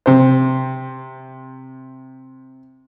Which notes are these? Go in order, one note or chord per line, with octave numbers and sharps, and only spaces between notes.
C3 C5